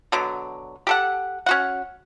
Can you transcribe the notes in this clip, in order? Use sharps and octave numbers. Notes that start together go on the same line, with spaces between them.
B2 D3 F#3
G4 A4 F#5
C#4 F#4 F#5